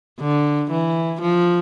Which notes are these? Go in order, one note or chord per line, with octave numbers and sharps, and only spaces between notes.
D3
E3
F3